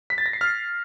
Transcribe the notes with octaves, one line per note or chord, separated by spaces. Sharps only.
B6
A6
A#6
C7
F6